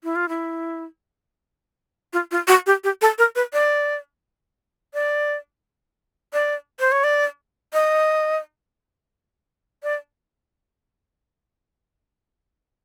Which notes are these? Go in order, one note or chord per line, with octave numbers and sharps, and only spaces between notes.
E4
F4
E4
F4
F4
F#4
G4
G4
A4
A#4
B4
D5
D5
D5
C5
C#5
D5
D#5
D5